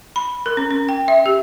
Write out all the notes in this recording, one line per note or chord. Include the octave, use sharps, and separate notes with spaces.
B5
A#4
C#4
C#4
G5
E5
G4